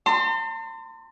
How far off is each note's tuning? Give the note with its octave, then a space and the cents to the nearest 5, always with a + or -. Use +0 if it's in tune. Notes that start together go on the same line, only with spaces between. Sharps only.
A5 +45 C6 -25